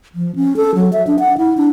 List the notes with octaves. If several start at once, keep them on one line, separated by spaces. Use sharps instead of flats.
F3
C#4
A4
F#3
E5
D4
F#5
E4
D4